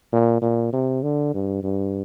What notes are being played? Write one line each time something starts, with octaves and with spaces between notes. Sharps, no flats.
A#2
A#2
C3
D3
G2
G2